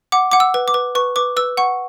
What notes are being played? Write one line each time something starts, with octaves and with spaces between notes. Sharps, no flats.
F#5 D6
F#5 D6
E6
B4
D6
B4
B4 C#6
B4 D6
B4 E6
F#5 C#6